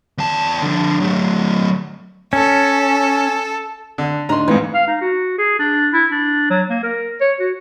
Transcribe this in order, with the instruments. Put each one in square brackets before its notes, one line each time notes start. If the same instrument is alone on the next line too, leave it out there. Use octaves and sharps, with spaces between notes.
[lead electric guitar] E2 A5
D3 F3
F#3 A3
[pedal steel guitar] C#4 [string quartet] A4
[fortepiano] D3
[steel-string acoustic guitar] D2 D4 D#4 [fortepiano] A#5 C6
[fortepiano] F2 G#2 [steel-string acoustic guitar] E3
[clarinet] F5
D#4
F#4
G#4
D4
E4
D4
F#3
A#3
A#4
C#5
F#4